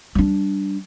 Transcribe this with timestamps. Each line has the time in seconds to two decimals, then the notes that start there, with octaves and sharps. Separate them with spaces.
0.15 G3 D4